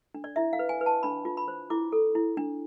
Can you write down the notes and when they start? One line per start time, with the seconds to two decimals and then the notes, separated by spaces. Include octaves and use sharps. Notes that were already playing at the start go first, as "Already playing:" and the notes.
0.14 D4
0.24 D5
0.36 E4 E5
0.53 F5
0.59 B4
0.69 G#5
0.81 B4
0.86 A5
1.03 D4 B5
1.25 F4
1.37 B5
1.48 C5
1.70 E4 D6
1.92 A4
2.15 E4
2.37 D4